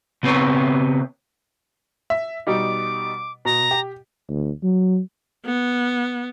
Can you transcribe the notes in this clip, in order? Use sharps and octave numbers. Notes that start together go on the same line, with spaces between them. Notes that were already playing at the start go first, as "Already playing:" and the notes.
C#3 B3 C4 B4 C#5
E5
B2 G3 D#4 D6
B2 A#5
G4
D2
F#3
B3